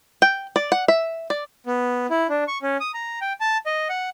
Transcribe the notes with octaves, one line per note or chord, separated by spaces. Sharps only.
G5
D5
F#5
E5
D5
B3
E4
D4
C#6
C#4
D#6
A#5
G5
A5
D#5
F#5